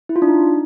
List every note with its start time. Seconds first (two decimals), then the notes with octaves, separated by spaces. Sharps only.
0.09 E4
0.16 F4
0.22 D4
0.28 D#4